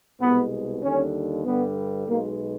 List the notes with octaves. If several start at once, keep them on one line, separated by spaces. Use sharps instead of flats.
C2 B2 G#3 B3
D#2 D3 G3 C#4
G2 D3 G3 B3
B1 B2 G#3 A#3